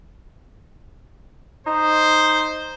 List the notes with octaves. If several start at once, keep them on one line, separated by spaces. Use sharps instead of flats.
D#4 C5